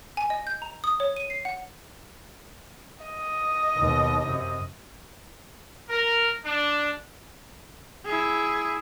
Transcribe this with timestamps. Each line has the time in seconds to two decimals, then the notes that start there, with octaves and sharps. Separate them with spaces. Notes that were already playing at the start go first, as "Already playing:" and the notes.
0.17 G#5
0.30 D#5
0.47 G6
0.62 A#5
0.84 D#6
1.00 C#5
1.16 D#7
1.30 C7
1.45 F#5
3.05 D#5
3.76 D#2 B2
4.25 F#2 C3
5.90 A#4
6.45 D4
8.06 E4 G#4